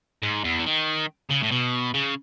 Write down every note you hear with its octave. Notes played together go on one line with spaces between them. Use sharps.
G#2
E2
E3
D#3
C#3
A2
B2
C#3